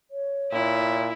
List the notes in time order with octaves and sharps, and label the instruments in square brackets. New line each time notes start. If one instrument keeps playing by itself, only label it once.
[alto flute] C#5
[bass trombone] A#2 [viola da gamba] E4